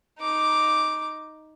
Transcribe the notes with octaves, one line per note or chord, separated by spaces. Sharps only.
D#4 D6